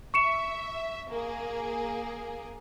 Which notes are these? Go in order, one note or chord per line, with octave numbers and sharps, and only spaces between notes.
E5 C#6 C#7 E7
A#3 G#4